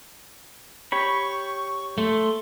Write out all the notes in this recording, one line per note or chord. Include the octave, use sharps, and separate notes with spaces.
G4 C#5 B5 C#6
A3 C6